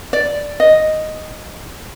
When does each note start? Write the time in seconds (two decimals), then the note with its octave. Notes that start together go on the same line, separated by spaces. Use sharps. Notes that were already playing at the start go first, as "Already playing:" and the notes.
0.13 D5
0.60 D#5